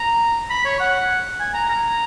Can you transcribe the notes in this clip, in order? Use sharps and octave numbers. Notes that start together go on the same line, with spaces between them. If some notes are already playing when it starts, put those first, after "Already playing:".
Already playing: A#5
B5
C#5
F#5
G#5
A#5
A#5